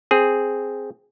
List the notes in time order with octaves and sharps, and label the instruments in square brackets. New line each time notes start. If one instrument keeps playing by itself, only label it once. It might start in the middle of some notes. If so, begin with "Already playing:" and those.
[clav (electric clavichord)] C4 G#4